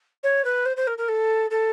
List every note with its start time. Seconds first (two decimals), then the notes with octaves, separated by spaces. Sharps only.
0.23 C#5
0.44 B4
0.65 C5
0.76 C5
0.87 A#4
0.97 A#4
1.08 A4
1.50 A4